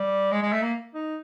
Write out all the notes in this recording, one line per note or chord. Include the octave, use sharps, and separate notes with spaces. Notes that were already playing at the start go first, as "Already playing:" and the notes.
Already playing: G3
G#3
G#3
A3
A#3
D#4